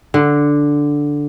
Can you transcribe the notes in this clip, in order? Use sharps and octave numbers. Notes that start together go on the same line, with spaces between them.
D3